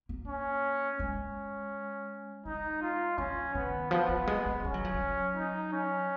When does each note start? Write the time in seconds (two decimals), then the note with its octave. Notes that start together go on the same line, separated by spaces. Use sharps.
0.09 A#3
0.28 C#4
0.99 G#3 C#4
2.46 G#3 D#4
2.82 F4
3.18 F#3 C#4
3.55 D#3 B3
3.91 F3 B3
4.09 F#3
4.28 G#3
4.46 G#3
4.64 G#3 C#4
4.74 F#3
4.85 F3
4.94 F#3
5.36 D#4
5.72 C#4